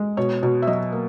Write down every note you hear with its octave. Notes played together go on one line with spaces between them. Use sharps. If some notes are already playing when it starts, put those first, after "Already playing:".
Already playing: G#3
B2 C#5
B2
E5
F#3 D#5
A#3